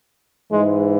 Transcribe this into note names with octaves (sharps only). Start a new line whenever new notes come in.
G#2 E3 G#3